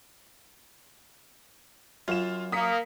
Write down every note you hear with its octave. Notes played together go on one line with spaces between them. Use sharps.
F#2 F4 E7
A#3 D#6 B6 C#7